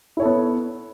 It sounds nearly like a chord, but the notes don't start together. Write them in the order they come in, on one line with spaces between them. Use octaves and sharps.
E4 C#5 A4 B3